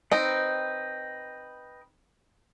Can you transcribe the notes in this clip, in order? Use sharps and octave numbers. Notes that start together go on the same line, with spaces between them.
C4 D#4 B4 D#5 G5